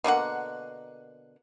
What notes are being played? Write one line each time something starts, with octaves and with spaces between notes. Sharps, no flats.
B2 D3 A#3 F#5